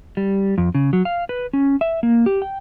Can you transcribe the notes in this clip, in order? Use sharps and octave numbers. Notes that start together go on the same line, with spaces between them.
G3
F2
C#3
F#3
F5
B4
C#4
E5
A#3
G4
G5